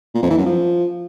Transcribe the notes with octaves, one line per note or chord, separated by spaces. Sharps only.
A#2
F2
E3
F#2
F3